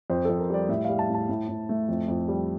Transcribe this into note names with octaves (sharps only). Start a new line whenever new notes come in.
F2 C5
F2 A4
A#4
G3 D5
A2 E5
G3 F5
A5
A2 A5
A2
A2
A3
F2
F2
G3